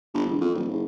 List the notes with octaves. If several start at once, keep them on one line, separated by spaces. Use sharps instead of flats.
G1
E1
F2
D#1
F#1